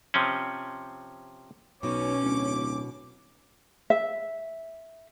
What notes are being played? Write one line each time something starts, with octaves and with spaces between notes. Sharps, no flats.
C3 F3 C4 C#4
B1 B2 C#4 D6
D1
E5